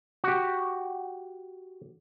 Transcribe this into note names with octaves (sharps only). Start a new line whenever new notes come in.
F#4 G4